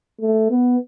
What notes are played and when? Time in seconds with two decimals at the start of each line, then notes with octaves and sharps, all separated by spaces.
0.21 A3
0.50 B3